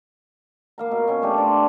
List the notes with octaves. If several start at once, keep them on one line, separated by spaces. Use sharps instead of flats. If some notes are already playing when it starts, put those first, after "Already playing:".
A#3 F5 A#5
B2
B2 C#4
A3 D4 G4
D4 C5 D5